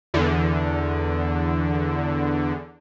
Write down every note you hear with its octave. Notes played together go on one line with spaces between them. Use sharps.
E2 D3